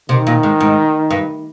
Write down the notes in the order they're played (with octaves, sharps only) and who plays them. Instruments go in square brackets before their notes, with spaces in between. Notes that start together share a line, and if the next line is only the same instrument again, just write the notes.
[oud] C3 [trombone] D#3
[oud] A#2
G#2
G#2
G2